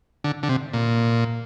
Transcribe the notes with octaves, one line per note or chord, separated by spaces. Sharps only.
D3
D3
C3
A#2